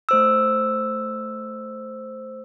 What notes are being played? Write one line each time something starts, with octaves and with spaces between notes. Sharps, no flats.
A3 C5 E6